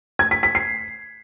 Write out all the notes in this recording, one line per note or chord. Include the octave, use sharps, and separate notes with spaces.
G#6
B6
B6
C7